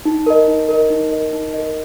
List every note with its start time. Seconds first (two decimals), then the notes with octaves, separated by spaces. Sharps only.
0.05 D#4
0.26 A#4 D#5
0.48 D#4
0.69 A#4 D#5
0.90 D#4
1.12 A#4 D#5
1.33 D#4
1.54 A#4 D#5